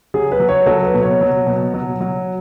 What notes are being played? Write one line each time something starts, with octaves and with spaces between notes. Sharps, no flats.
F#3 G#4
B4
F#3
C#5
F#3 A4
B4
B2
C#5
F#3
B2
F#3
F#3